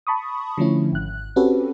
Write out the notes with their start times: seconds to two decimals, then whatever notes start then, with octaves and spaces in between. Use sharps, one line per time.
0.07 A5 B5 C#6 D#6
0.58 D3 F3 A3 C#4 E4
0.92 G#1 F#6
1.36 C4 C#4 F#4 G4 A4 B4